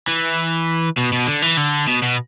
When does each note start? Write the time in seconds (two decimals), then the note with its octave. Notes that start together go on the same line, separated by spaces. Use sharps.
0.07 E3
0.97 B2
1.13 B2
1.27 D3
1.42 E3
1.57 D3
1.87 B2
2.02 B2